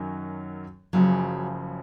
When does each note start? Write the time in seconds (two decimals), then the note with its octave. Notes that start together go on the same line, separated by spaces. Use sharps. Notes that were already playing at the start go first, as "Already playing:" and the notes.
Already playing: F#2 D#3 F#3 C#4 F#4
0.93 F#1 F#2 C#3 F3 F#3